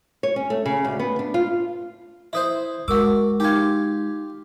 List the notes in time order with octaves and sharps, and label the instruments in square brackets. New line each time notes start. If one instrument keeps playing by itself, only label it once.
[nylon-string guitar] C#5
C#4
A3
C#3
D2
B3
D4
F4
[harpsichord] E4 B4 C5 [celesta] E5 D#6
[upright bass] G#3 [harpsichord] F#4 D6 [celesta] A#4 E6
[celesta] D#4 G#6 [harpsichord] F4 G4